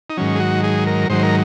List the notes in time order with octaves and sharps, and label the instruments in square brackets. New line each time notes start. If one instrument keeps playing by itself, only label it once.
[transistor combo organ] D#4
G#2 D#3 F#3 C#4
G#4
F#4
G#4
A#4
G#2 D#3 F#3 C5
A#4